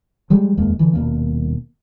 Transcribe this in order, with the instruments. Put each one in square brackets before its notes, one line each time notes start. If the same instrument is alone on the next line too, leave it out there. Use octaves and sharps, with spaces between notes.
[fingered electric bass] F3 G3 G#3
D#1 F2 G#3 A#3
D3 E3
D#1 D#2 B2 A#3